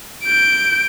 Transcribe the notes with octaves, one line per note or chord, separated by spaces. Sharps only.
G6 D7